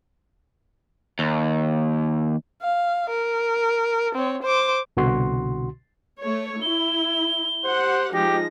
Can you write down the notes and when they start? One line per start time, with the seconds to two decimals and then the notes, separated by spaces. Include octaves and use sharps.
1.19 D#2
2.62 F5
3.10 A#4
4.15 C4 C#5
4.43 C5 D6
4.97 C2 B2 D3 F#4 C6
6.20 A3 C#5
6.62 E4 G7
7.64 G4 C5 F#5
8.13 F3 G#3 D#4 G4 A#6